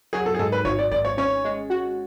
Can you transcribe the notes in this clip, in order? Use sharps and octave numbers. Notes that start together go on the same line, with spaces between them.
F#3 G#4
A4
G#4
G#2 A4
B4
G#1 C#5
D5
G#1 D5
C#5
C#4 C#5
G#3
F#4